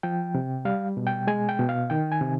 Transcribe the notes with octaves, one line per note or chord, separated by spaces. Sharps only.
F3 G5
C3
G3 F5
B2
G5
G#3 G#5
G5
B2
F5
D#3 G5
G#5
C3